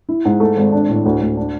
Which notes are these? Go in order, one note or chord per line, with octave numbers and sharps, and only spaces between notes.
E4
G#2
A3
G#1
D4
A2
D2
D2
D4